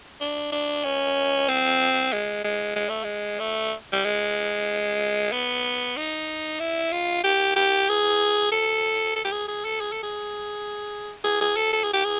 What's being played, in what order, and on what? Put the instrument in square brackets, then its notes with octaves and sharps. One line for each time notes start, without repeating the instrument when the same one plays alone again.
[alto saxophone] D4
D4
C#4
C4
G#3
G#3
G#3
A3
G#3
A3
G3
G#3
B3
D#4
E4
F4
G4
G4
G#4
A4
A4
G4
G#4
G#4
A4
G#4
A4
G#4
G#4
G#4
A4
A4
G#4
G4
G#4